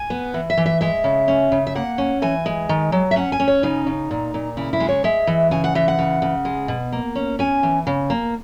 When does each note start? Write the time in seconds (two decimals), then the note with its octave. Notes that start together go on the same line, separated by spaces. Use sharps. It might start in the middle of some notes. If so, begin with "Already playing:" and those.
Already playing: G#5
0.10 B3
0.34 E3
0.50 E5
0.57 E3
0.66 E5
0.81 G#3 E5
1.04 C#3
1.28 C#4
1.52 C#3
1.67 E5
1.75 A#3 F#5
1.98 C#4
2.22 E3 G#5
2.46 G#3
2.69 D#3
2.92 F#3
3.11 E5
3.16 C#4 F#5
3.32 G#5
3.40 C#4
3.48 C#5
3.63 C#3 D#4
3.87 C#3
4.11 A#2
4.34 A#2
4.57 C#3 E4
4.73 E4
4.80 G#3
4.89 C#5
5.04 G#3 E5
5.27 E3
5.51 C#3 G#5
5.64 F#5
5.75 E3 E5
5.88 F#5
5.99 C#3
6.22 C#3
6.45 G#3
6.68 B2
6.92 A#3
7.15 C#4
7.39 C#4 G#5
7.63 E3
7.87 C#3
8.10 A#3